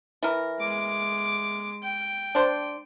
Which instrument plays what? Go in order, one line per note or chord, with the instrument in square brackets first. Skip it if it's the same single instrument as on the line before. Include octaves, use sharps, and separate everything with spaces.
[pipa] E3 A#4
[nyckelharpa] G#3 D6
G5
[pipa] D4 C5